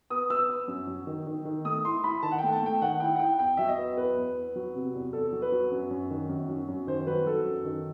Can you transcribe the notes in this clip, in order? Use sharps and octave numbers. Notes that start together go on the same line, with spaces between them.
B3 D#6
B3 E6
B3
F#2
F#3
D#3
D#3
D#3
A3 D#6
E4 C6
E4 B5
D#3 A5
F#5
A3 G5
A5
A3 G5
D#3 F#5
E4 G5
F#5
E4 G5
E2 G5
F#3 E5
D#5
B3
E2 B4
E2
B3
F#3
C3
E2
E2 A4
F#3
B4
F#3
F#2
F#2
D#3
F#2
F#3
F#2
D#3 C5
F#3 B4
F#3 A4
F#2
D#3